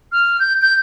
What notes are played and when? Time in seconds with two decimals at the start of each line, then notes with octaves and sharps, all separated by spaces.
0.12 F6
0.39 G6
0.62 G6